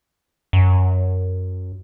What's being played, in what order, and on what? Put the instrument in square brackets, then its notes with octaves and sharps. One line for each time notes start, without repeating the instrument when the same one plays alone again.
[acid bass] F#2